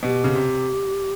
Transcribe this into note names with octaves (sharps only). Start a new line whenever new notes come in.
B2 G4
C#3
C3